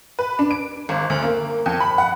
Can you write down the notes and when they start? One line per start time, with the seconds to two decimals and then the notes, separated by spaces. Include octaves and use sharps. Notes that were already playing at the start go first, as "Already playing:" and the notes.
0.19 B4
0.39 D4
0.51 D7
0.89 G#1
1.10 D2
1.23 A#3
1.66 F2
1.80 B5
1.98 F#5